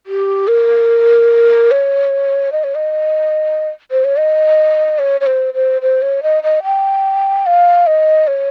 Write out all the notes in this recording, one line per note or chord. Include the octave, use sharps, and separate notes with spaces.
G4
A#4
C#5
D#5
C#5
D#5
C5
C#5
D#5
C#5
C#5
C5
C5
C5
C#5
D#5
D#5
G5
F5
D#5
C#5